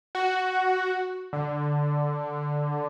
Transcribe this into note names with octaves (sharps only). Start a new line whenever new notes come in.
F#4
D3